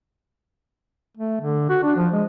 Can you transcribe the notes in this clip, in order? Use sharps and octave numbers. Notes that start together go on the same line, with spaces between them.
A3
D3
F#4
D4
F3
G#3